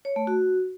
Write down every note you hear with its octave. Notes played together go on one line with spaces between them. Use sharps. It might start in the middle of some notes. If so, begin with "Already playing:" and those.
C#5
A3
F#4